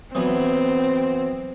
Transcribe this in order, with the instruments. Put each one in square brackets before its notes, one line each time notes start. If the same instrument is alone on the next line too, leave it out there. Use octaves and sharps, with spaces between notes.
[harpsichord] E3 F#3 B3 [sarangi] C4